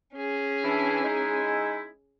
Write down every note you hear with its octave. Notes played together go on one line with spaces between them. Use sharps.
C#4 G#4
E3 D4 E4
G#3 D#4 E4